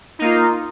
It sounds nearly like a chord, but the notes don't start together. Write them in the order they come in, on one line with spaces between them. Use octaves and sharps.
D#4 A#3 F4